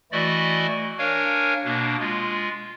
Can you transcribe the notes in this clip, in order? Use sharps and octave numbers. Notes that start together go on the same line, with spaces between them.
E3 A3 E4 F#4 D5 D#5
D4 A#4 C#5 F5 G#5
B2 A#3 D4
G#3 F4